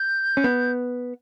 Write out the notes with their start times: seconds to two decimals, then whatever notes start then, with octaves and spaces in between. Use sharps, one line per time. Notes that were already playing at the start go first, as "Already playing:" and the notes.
Already playing: G6
0.37 C#4
0.44 B3